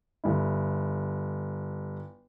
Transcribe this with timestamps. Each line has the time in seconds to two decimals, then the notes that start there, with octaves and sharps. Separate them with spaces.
0.24 G1 E4